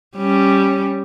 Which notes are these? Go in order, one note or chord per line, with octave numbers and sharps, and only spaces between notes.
G3 C#4